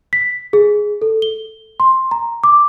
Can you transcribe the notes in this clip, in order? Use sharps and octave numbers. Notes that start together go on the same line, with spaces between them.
B6
G#4
A4
G7
C6
A#5
D6